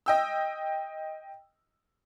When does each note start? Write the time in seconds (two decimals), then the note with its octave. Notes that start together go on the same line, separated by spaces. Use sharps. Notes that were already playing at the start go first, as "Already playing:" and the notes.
0.06 D#5 G5 E6